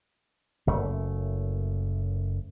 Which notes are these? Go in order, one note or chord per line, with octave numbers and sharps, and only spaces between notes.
F#1 F#2 A3